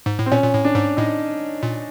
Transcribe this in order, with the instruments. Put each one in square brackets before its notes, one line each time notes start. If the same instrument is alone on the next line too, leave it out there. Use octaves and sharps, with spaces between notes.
[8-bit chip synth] G#2
A2
[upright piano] C4
[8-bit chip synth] A#2 [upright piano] C#4
[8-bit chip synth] A#2
A2
[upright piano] D4
[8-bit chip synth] G#2
[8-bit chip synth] A2 [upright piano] D#4
[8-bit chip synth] A#2